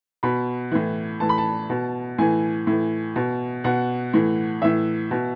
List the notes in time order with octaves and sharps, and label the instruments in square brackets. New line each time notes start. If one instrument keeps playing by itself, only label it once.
[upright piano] B2 B5
A2 E3
A2 E3 A5
B5
A5
B2
A2 E3 G#5
A2 E3
B2
B2 F#5
A2 E3
A2 E3 E5
B2